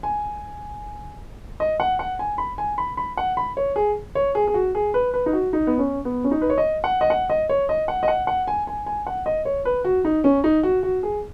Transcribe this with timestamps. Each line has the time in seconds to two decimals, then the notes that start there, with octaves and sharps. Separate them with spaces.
0.03 G#5
1.60 D#5
1.80 F#5
1.99 F#5
2.19 G#5
2.38 B5
2.58 G#5
2.78 B5
2.97 B5
3.17 F#5
3.37 B5
3.57 C#5
3.76 G#4
4.15 C#5
4.35 G#4
4.47 G#4
4.54 F#4
4.75 G#4
4.94 B4
5.14 B4
5.26 D#4
5.33 F#4
5.53 D#4
5.67 B3
5.79 C#4
6.05 B3
6.24 C#4
6.31 D#4
6.41 B4
6.50 C#5
6.58 D#5
6.84 F#5
7.01 D#5
7.10 F#5
7.30 D#5
7.49 C#5
7.69 D#5
7.88 F#5
8.03 D#5
8.08 F#5
8.27 F#5
8.47 G#5
8.67 G#5
8.86 G#5
9.07 F#5
9.26 D#5
9.45 C#5
9.65 B4
9.84 F#4
10.05 D#4
10.24 C#4
10.44 D#4
10.63 F#4
10.83 F#4
11.03 G#4